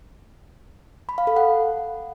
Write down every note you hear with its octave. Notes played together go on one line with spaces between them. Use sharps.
B5
F5
A4
F#5